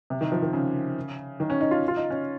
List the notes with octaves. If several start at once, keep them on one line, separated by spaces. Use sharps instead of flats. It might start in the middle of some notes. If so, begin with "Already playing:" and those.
C3
D#3
F3
D#3
C#3
D#3
C#4
D#4
F4
F4
D#4
C#4